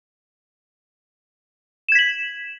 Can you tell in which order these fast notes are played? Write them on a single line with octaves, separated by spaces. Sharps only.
E7 G#6 B6 F#7